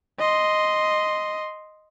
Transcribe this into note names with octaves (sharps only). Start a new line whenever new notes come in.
D#5 C6